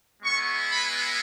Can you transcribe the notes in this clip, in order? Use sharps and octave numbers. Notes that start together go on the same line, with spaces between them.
G#3 B3 E4 C#6
B5